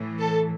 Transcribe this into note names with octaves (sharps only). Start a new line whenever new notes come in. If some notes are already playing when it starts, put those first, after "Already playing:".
Already playing: A2 E3
A4